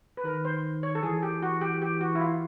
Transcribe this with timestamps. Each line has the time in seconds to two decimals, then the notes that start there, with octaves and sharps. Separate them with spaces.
0.17 B4
0.24 D#3 A#4
0.45 C5
0.83 C#5
0.95 A4
1.03 E3 G#4
1.23 G4
1.42 F#4
1.61 G4
1.82 G4
2.01 F#4
2.15 E4
2.20 F4